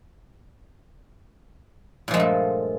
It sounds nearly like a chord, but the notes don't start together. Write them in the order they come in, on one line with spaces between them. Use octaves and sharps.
A#2 F3 G#3 G2 A3